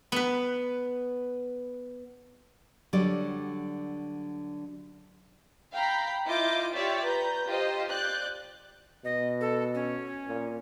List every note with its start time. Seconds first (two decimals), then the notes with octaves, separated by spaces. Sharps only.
0.12 B3 B4
2.93 D3 F#3 G3 D5
5.72 F5 G5 A#5 B5 G6
6.26 E4 F4 D#5 D6 G6 D7
6.73 F4 G4 C#5 D5 E5
7.04 B4 A#5 G6
7.47 F4 G4 C5 D#5
7.89 D5 F#6 G6
9.05 B2 D#5
9.41 A4
9.74 C#4
10.28 A#2